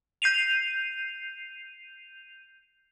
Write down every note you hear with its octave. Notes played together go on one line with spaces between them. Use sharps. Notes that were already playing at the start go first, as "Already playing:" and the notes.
G6 C7 D#7 F7